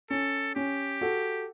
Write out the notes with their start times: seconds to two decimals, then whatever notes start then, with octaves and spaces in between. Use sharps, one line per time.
0.10 C#4 A4
0.55 C#4 G4
1.01 F#4 A4